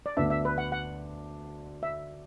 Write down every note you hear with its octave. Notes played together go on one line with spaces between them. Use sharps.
D5
D2 D3 B3 D4 E5
E5
B4
F#5
F#5
E5